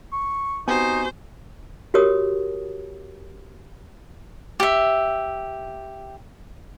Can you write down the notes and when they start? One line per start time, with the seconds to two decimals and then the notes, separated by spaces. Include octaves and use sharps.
0.13 C#6
0.68 B3 C4 D#4 F#4 G4 C5 G#5
1.94 F#4 G4 A#4 C#5 D#6
4.60 G4 E5